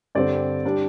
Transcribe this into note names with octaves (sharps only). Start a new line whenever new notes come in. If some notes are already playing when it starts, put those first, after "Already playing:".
G2 D3 C4 D5
G3 D4